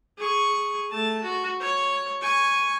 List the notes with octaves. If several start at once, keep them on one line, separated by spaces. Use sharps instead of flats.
G#4 C#6
A3 A5
F#4
C#5
G#5 C#6